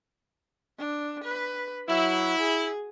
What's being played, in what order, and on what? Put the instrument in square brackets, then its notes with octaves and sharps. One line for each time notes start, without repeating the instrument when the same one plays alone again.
[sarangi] D4
B4
[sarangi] F#3 [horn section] E4
[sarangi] G#4